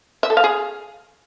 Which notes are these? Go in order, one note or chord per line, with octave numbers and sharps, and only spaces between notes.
E5
A4
F5
G#4